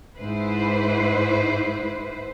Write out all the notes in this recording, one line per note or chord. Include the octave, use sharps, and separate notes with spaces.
G#2 E4 B4 C5